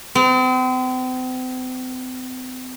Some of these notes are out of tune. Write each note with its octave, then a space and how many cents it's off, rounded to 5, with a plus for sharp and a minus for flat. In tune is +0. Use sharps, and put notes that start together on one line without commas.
C4 -40